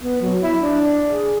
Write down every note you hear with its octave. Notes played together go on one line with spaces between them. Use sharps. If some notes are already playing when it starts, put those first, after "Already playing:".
B3
F#3
E4
D4
G#4